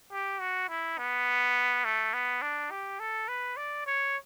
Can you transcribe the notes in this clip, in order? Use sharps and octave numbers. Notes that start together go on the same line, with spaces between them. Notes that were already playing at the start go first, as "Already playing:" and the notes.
G4
F#4
E4
B3
A3
B3
D4
G4
A4
B4
D5
C#5